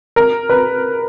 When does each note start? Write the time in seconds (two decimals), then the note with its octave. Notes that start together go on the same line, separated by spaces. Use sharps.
0.16 A#4
0.49 B4